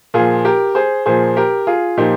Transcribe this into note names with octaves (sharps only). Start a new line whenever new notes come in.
A#2 F3 F4 G#4
G4 A#4
G#4 C5
A#2 F3 G#4 C5
G4 A#4
F4 G#4
A#2 F3 D#4 G4